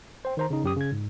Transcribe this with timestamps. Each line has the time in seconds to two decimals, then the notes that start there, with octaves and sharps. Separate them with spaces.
0.25 C5 G5
0.37 D#3 C5 A#5
0.50 C#3 D#4
0.64 F#2 G4 D#6
0.76 C#3 G#6
0.92 G#2